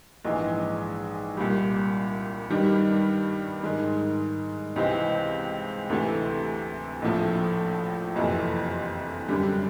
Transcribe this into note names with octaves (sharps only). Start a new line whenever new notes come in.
A#1 G#2 E3 G#3
C2 A#2 G3
G2 D#3 G3
G#2 D#3 G#3
C#2 C3 E3 G#3 C4
D2 C3 E3 A3
A#1 A2 F3 A3
F#1 F2 C3 E3
F#2 D3 G3